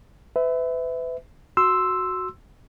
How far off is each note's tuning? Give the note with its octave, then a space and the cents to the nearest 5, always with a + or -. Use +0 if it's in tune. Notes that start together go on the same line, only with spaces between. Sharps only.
B4 +35 E5 -10
F#4 +0 C6 +0 E6 +0